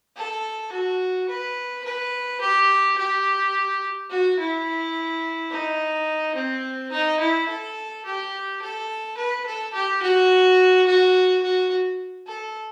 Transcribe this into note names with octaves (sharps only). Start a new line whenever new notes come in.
A4
F#4
B4
B4
G4
G4
F#4
E4
D#4
C4
D#4
E4
A4
G4
A4
B4
A4
G4
F#4
F#4
F#4
A4